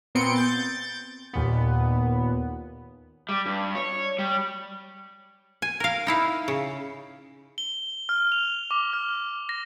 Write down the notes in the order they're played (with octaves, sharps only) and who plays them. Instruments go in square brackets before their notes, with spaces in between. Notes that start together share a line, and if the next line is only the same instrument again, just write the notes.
[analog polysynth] A#2 B3 C4 C6 C#7 D7
G6 A6
D#2 A#2 B3
[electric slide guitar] G3
G2
C#5
G3
[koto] G#5
A#4 F5
D#4 E4 F5
C#3
[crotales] G7
F6
F7
D6
F6
A#6